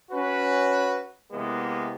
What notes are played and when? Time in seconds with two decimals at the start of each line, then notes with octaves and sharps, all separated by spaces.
0.12 C#4 F#4 B4
1.32 C3 E3 G#3 A#3 B3